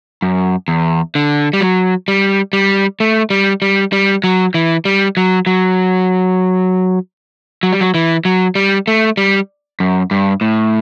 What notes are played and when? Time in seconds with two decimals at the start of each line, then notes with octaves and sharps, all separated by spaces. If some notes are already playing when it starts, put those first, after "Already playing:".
0.22 F#2
0.68 E2
1.15 D3
1.53 G3
1.61 F#3
2.08 G3
2.53 G3
3.00 A3
3.30 G3
3.62 G3
3.93 G3
4.24 F#3
4.54 E3
4.85 G3
5.17 F#3
5.47 F#3
7.63 F#3
7.73 G3
7.81 F#3
7.94 E3
8.25 F#3
8.55 G3
8.88 A3
9.17 G3
9.80 F#2
10.11 G2
10.41 A2